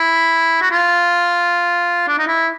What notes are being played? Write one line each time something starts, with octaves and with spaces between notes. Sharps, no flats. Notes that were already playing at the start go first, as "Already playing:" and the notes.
Already playing: E4
F#4
F4
D4
D#4
E4